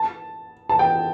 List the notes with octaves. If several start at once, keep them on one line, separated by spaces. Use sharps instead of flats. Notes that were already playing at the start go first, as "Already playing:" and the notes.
Already playing: A5
A5
G5